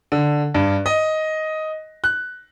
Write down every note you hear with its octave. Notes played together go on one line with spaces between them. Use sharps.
D3
G2
D#5
F#6